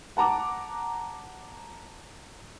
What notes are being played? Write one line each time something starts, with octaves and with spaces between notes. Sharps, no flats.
F#5 A5 A#5 D6